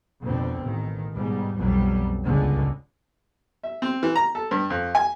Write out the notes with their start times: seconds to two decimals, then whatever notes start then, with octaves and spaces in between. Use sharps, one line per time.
0.21 F2 B2 D3 C4
0.61 A1 D#3
1.14 G#2 B2 G3
1.56 B1 F2 B2 F#3 G3
2.23 G1 C#2 D3 G#3
3.63 E5
3.82 C4
4.03 E3
4.16 A#5
4.35 A4
4.51 G2
4.70 F2
4.95 G#5